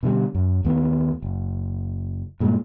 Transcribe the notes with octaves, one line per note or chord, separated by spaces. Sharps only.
B2 D3 F#3 G3
F#2
D#2 D#3 A3 B3
F#1
G2 A#2 G#3